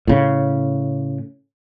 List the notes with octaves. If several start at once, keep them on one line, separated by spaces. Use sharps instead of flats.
A2 C#3